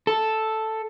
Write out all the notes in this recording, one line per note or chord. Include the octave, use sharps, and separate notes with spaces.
A4